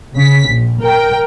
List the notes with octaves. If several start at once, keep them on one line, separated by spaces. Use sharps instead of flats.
C#3 B6
A#1
A#4 G5